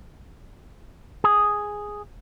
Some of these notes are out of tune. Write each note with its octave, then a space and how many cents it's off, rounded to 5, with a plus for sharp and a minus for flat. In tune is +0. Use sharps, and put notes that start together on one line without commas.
G#4 +0